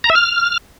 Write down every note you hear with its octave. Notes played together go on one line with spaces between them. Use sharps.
A#5
E5
F6